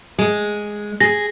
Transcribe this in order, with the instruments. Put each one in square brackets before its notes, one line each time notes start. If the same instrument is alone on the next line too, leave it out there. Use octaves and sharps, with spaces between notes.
[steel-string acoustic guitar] G#3
[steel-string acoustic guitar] G#4 [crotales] A#6